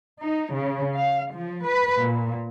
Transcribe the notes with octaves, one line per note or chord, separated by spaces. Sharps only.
D#4
C#3
F5
F3
B4
A#2